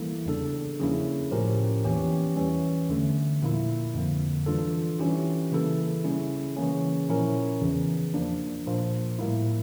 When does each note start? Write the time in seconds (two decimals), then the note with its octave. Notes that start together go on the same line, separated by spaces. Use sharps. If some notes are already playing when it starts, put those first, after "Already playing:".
Already playing: E3 G3 A#3 E4 A4
0.26 E2 C#3 G3 D4 A4
0.79 C#3 F3 A#3 C#4 E4
1.31 A2 F3 C#4 G4 A#4
1.84 E2 E3 A#3 C#4 G4
2.36 E3 G3 C#4
2.89 E2 D3 A3
3.42 A#2 F3 A#3 E4
3.94 F2 D3 F3 A#3
4.46 E3 G3 D4 F4 A4
4.99 E3 G3 C#4 E4 G4
5.52 C#3 E3 A#3 E4 A4
6.04 C#3 G3 C#4 E4
6.57 C#3 E3 A#3 C#4
7.09 A#2 F3 C#4 E4 A#4
7.62 E2 C#3 E3
8.14 F3 A#3 D4
8.66 A#2 F3 A#3
9.19 A2 G3 A#3 E4